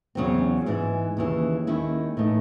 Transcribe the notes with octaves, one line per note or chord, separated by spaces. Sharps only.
E2 C#3 F#3 C4
G#2 E3 G#3
D#2 C#3 E3
D#2 D#3 G#3 C#4 E4
A2 E3 A3 D#4